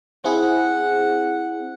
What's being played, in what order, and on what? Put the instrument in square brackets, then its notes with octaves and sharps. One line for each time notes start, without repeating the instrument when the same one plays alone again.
[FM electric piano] C4 E4 G#4 [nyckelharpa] F#5